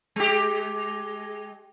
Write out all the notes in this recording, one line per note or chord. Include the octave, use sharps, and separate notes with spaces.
G#3 G4